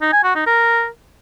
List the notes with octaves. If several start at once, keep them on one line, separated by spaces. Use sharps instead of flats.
D#4
G#5
F#4
D#4
A#4